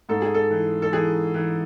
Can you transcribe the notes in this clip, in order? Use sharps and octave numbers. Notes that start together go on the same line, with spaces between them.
G#2 A4
G#4
A4
E3
A4
E3 G#4
E3